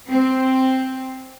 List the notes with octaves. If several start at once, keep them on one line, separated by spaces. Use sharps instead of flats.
C4